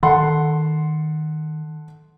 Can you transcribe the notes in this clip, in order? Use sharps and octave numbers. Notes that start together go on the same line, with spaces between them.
D#3 A4 F#5 C6